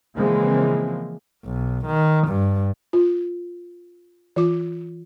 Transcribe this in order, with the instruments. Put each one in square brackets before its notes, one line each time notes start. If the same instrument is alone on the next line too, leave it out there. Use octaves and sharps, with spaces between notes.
[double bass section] C#3 E3 F3 G#3 A#3 C4
[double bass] B1
D#3
G2
[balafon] F4
E3 F4 D6